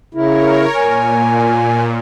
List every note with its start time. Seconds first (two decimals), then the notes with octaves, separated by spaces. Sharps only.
0.14 C#3 E4 A#4 C#5
0.76 A#2 G#5